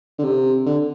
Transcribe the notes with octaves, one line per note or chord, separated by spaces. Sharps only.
D3
C3
D3